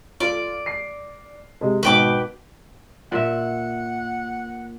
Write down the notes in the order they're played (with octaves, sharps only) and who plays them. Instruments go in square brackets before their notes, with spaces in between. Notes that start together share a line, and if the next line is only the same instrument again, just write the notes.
[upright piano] F4 A4 [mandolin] D5
[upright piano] C7
C3 G#3
[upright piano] G#1 B2 [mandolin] B4 G5 D6
[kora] A#2 E5 [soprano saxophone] F#5